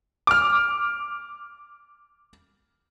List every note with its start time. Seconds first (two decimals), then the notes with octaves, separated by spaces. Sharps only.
0.27 D6 F6